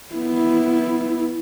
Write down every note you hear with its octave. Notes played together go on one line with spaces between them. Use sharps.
B3 E4